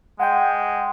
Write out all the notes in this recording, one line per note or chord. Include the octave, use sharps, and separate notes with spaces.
G#3 F#5 G5